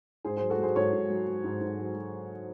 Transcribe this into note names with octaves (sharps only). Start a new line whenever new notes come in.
G#2 G#4 C5
F#3 G#4 C5
F#4 A4
F#3 G#4 C5
G#2 A4 C#5
G#2
F#3
F#3
G#2
G#2
F#3
F#3